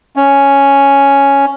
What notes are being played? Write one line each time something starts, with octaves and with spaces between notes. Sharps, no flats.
C#4